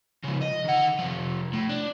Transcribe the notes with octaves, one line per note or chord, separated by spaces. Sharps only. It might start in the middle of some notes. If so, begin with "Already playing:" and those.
C#3 F3
D#5
D#3 F#5
C3 F3
A2
D4